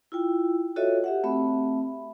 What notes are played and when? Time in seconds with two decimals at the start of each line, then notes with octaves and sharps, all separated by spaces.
0.12 E4 F4 G5
0.76 F4 F#4 A4 C#5 D#5 E5
1.04 G4 E5 F#5
1.24 A3 C4 E5 B5